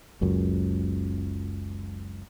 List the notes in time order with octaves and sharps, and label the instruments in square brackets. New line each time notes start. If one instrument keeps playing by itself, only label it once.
[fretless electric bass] F#1 C#2 F#2